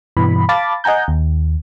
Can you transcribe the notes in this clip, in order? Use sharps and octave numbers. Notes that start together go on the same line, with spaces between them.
G2 B2 E3 B5
F5 A5 B5 D6 A6
D#5 F#5 G#5 A#5 G6
D#2